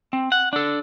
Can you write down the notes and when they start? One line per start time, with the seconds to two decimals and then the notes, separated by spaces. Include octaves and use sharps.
0.13 C4
0.32 F#5
0.53 D4 A4